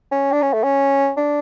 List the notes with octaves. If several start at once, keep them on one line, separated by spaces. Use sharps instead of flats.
C#4
D4
C#4
A3
C#4
D4